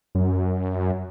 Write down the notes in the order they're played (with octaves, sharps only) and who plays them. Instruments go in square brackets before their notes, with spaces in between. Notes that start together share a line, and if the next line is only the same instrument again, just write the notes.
[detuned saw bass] F#2